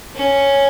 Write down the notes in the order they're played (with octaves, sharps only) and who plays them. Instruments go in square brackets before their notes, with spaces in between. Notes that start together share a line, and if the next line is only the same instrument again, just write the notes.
[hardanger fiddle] C#4